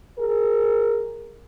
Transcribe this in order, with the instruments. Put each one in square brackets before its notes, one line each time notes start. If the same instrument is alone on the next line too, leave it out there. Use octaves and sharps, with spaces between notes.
[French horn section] G#4 A#4